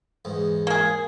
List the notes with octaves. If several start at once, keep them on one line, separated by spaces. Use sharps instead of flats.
E2 G#2
A#3 G#4